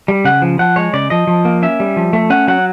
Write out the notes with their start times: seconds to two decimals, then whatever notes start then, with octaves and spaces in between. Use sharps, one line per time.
0.08 G3
0.25 C#3 F#5
0.42 F3
0.59 F3 F#5
0.76 G#3 C#5
0.93 C#3 D5
1.10 F3 D#5
1.27 F3
1.45 A#3
1.62 C#4 E5
1.80 G3
1.96 F3
2.13 A3
2.30 C#4 F#5
2.48 F#3 F#5